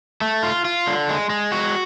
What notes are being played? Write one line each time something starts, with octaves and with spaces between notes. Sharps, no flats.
A3
F4
F4
D3
G#3
G#3
F#4